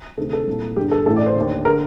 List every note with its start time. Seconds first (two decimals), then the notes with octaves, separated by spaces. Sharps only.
0.17 D2 C3 D#3 A4
0.33 A4
0.48 C2 A#2
0.76 G1 G2 D3 G4
0.91 A4
1.06 A1 A2 A4
1.16 D5
1.26 C5
1.36 D#2 D3
1.65 D3 A#4